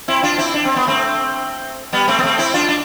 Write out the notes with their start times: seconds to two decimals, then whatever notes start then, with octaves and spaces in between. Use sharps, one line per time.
0.08 C4 E4
0.23 D4 F4
0.38 C4 E4
0.54 D4
0.65 C4
0.76 B3
0.87 A3 C4
1.93 G3 B3
2.08 A3 C4
2.19 B3
2.24 A3 C4
2.38 C4 E4
2.54 D4 F4
2.69 D4